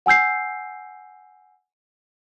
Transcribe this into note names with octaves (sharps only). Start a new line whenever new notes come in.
F#5 G#5 E6 G6 C7